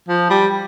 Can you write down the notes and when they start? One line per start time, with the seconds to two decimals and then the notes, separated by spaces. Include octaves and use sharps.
0.08 F3
0.30 G3